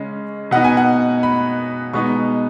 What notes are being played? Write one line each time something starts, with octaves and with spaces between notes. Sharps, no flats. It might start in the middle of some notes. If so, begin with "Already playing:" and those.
Already playing: C#3 G#3 C#4
B2 B3 D#4 F#5
G#5
F#5
B5
B2 G#3 B3 D#4 C#6